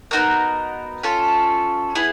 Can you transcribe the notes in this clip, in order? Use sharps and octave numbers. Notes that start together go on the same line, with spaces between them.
B3 D#4 F#4 A#4
C#4 F4 A4
B3 E4 G#4